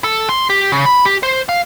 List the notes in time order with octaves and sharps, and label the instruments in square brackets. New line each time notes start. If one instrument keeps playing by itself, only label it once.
[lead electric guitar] A4
C6
G4
C#3
B5
G4
C5
F5